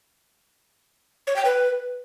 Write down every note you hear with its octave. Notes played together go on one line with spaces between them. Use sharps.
C#5
G5
B4